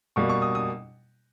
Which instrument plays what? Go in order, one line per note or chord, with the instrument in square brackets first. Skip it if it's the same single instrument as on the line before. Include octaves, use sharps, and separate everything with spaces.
[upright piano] B2 G3 A#3 C#6
C#6
D#6
D#6